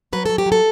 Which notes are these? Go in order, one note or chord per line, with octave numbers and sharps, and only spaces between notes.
F#3 B4
F#3 A4
G4
F#3
A4